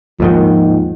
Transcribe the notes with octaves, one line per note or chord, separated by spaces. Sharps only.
D#2 G#2 D#3 F3